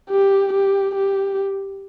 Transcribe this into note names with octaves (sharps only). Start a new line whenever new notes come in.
G4
G4
G4